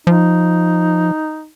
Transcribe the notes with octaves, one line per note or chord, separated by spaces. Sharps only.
F3 D#4